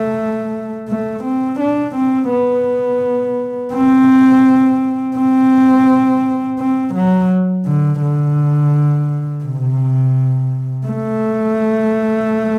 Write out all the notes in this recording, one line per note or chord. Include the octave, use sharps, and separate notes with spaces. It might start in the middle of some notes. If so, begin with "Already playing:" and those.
Already playing: A3
A3
C4
D4
C4
B3
C4
C4
C4
F#3
D3
D3
C3
A3